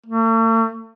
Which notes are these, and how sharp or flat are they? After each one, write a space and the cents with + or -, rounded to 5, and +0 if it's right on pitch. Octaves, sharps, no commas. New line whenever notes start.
A3 +45